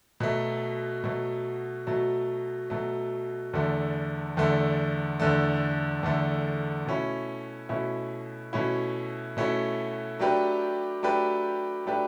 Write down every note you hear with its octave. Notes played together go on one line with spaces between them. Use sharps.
B2 F#3 A3
B2 F#3 A3
B2 F#3 A3
B2 F#3 A3
E2 D3 A3
E2 D3 A3
E2 D3 A3
E2 D3 A3
B2 A3 C#4 E4
B2 A3 C#4 E4
B2 A3 C#4 E4
B2 A3 C#4 E4
F#3 A3 D4 G4 B4
F#3 A3 D4 G4 B4
F#3 A3 D4 G4 B4